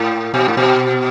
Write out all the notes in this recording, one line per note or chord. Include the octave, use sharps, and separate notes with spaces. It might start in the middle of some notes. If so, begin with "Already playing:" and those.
Already playing: A2
B2
A2
B2